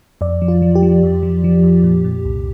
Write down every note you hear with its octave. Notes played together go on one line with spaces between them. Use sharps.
F2 D5
F3
F4
F3
G4
F3
F2
F3
F3
F2
A#2
A#2
C2